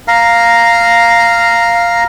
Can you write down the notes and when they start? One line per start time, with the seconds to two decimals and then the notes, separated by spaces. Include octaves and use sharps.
0.08 F5 A#5